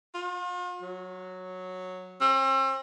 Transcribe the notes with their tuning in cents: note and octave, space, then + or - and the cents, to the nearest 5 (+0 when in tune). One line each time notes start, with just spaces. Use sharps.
F4 +40
F#3 -5
C4 +40